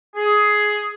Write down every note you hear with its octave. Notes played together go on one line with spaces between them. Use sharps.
G#4